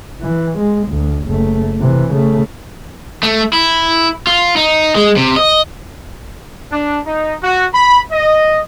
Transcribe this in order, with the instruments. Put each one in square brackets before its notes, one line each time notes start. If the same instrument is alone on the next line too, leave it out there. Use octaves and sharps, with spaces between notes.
[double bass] E3
G#3
D2
F#1 A3
C3 E3
C#3 A3
[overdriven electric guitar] A3
E4
F4
D#4
G#3
C3
D#5
[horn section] D4
D#4
F#4
B5
D#5